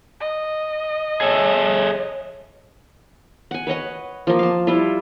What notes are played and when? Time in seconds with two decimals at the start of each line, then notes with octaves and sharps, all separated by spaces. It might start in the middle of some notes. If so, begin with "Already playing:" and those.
0.20 D#5
1.21 G#4 A4 C#5 E5
3.51 F#5 G#5
3.67 B4 C#5 D#5 F#5
4.27 F3 A#3
4.39 F5 A5
4.67 G3 E4 F4